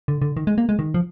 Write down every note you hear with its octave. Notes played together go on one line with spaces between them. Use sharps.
D3
D3
D#3
G#3
A#3
G#3
D#3
F3